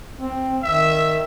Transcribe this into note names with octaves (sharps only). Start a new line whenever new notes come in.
C4
D#3 E5